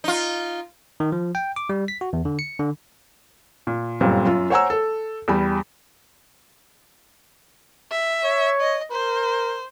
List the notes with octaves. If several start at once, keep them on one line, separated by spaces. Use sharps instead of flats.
D#4 F4
D#3
F3
G5
D6
G3
B6
F#4
E2
D3
C#7
D3
A#2
G1 F#2 A#2 G3 C4
F#2 F4
C5 C#5 F#5 G#5 A#5 E6
A4
E2 G3 B5
E5
C#5
D#5
A#4 C5